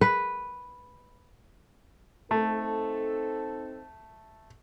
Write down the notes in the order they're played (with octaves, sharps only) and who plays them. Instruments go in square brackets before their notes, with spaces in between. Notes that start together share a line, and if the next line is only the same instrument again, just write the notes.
[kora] B4
[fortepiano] A3 [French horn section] C4 D#4 A4